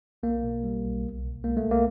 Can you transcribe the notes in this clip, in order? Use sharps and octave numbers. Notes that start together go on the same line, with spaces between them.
B1 A#3
B2
G3
B1
C2
B2
G#3 A#3
A3
C2
A#3